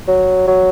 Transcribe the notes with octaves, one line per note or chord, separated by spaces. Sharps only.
F#3
F#3